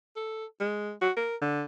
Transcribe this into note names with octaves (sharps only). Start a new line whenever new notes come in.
A4
G#3
F#4
A#4
D3